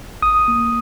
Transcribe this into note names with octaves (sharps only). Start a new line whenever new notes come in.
A1 D#6
A#3